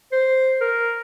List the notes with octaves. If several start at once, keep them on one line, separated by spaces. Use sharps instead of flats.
C5
A#4